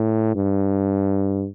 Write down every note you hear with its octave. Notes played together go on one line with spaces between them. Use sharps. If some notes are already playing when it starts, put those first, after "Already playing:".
Already playing: A2
G2